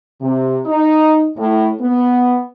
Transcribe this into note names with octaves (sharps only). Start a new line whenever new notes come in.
C3
D#4
A2
B3